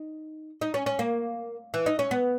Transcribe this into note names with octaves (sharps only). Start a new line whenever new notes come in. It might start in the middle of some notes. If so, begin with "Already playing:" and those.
Already playing: D#4
D#4
C#4
C#4
A#3
E3
D#4
C#4
B3